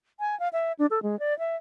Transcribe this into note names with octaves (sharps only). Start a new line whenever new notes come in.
G#5
F5
E5
D4
A4
G#3
D5
E5